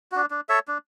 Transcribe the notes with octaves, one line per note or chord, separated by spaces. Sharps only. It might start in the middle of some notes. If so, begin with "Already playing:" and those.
D4 F#4
D4
A4 C#5 E5
D4